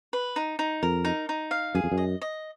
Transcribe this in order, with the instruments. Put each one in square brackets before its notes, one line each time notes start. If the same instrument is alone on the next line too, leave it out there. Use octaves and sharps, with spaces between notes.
[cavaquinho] B4
D#4
D#4
[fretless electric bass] F2 [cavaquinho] A#4
[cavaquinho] D#4
D#4
F5
[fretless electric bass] F#2 [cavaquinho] G#4
[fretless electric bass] F2
F#2
[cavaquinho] D#5
D#5